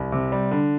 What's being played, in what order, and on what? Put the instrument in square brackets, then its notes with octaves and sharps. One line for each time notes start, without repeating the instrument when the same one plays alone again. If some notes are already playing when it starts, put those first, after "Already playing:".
Already playing: [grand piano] C2
C3
G3
D3